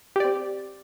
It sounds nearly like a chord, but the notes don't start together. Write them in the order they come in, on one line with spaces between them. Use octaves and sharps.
G4 D5 C4